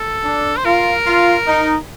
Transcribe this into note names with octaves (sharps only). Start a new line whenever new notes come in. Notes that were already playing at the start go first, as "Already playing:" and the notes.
Already playing: A4
D4
C5
F4 A#4
F4
D#4